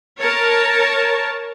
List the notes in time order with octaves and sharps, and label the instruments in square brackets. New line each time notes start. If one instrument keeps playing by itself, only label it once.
[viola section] A#4 C#5 A5